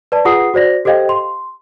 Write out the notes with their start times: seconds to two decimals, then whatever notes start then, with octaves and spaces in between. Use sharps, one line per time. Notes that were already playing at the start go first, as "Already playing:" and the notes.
0.12 B4 D5 A5
0.25 F4 G#4 B4 F#5 D#6 C7
0.54 F#4 C5 D5 A#6
0.85 G4 A4 C5 D#5 F5 G5
1.09 C6